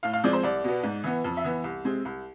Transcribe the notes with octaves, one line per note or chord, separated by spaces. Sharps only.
A2 F5
F5
F3 G#3 C4 D5
C5
C2 D5
B2 B3
G#2
E3 B3
F2
E5
E3 B3
C2
C3 G#3 C4
C2